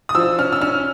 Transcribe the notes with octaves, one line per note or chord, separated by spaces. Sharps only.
D#6
F3 E6
C#4 F6
E6
C#4 F6